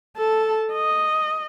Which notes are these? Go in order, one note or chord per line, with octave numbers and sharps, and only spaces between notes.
A4 A5
D#5